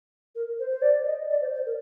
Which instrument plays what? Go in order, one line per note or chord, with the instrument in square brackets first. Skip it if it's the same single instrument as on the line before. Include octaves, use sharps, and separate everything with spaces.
[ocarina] A#4
C5
C5
D5
D#5
D5
C5
C5
A#4